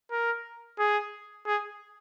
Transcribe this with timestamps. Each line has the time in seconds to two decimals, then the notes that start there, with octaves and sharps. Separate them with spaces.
0.11 A#4
0.79 G#4
1.46 G#4